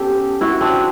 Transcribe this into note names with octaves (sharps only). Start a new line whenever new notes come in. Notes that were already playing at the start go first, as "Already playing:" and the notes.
Already playing: B3 C#4 G4 A4
E4 F#4
C4 D4